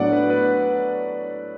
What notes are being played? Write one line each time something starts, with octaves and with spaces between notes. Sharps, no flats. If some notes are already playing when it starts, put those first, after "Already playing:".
Already playing: A2 F#3 B3 D4 D5 F#5
B4
B4